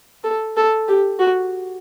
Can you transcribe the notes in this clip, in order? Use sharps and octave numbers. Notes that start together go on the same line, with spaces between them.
A4
A4
G4
F#4